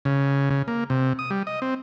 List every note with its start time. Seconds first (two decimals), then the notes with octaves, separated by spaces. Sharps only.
0.05 C#3
0.50 C#3
0.68 A#3
0.90 C3
1.19 D#6
1.31 G3
1.47 D#5
1.62 C4